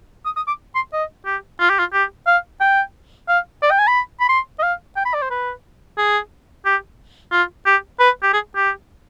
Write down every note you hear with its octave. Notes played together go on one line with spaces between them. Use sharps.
D#6
D#6
D6
C6
D#5
G4
F4
G4
F4
G4
F5
G5
F5
D5
G5
G#5
B5
B5
C6
D#5
F5
G5
B5
D5
C5
B4
G#4
G4
F4
G4
B4
G4
G#4
G4